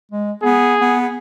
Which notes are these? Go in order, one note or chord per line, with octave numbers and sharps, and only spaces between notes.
G#3
B3 G#4
B3